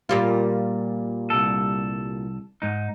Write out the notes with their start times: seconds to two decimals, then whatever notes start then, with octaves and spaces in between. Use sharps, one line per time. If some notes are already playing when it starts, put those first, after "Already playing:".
0.09 A#2 G3 F4
1.30 C2 A4
2.62 G#2 D#4